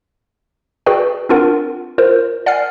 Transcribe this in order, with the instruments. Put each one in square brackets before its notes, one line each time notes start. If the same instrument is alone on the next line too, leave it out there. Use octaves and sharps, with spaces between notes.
[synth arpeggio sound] F#4 G#4 B4 D5 G5
C4 D4 F4 A#4 F#5
F4 A#4 C5
D5 F#5 G#5 F6 C7